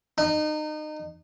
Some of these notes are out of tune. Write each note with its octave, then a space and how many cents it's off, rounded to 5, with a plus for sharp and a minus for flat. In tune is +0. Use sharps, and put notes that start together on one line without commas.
D#4 -30